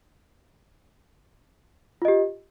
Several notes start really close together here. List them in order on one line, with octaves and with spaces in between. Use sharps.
F4 D#5 G4